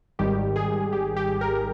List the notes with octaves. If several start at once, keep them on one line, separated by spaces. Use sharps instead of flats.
G#1 G#2 D#3 G3 G4
G#4
G4
G4
A#4